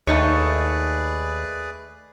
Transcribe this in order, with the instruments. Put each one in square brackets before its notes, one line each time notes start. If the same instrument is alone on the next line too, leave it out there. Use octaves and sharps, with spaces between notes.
[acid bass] D#2 [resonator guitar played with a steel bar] A3 D#4 C#5 [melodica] G#4 B4 D5